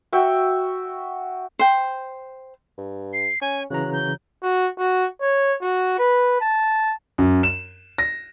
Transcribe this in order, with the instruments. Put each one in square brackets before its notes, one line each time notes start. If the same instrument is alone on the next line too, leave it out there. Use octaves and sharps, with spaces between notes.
[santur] F#4 E5 G5
[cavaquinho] C5 G5
[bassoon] G2
[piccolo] C7
[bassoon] C#4 [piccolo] G#5
[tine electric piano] C#3 E3 A#5 [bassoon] F#3 [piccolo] F#6
[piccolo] G6
[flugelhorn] F#4
F#4
C#5
F#4
B4
A5
[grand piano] F#2
E7
A#6